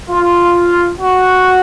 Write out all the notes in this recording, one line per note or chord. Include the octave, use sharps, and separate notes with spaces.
F4
F#4